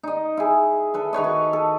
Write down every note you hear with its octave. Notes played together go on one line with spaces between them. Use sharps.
D#4 D#5
E4 G#4
A4 B4 E5
D#3 B4 C#5 D#5
F#4
A4